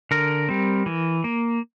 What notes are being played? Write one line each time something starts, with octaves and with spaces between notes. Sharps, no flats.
D3 A#4
G3 C4
E3
A#3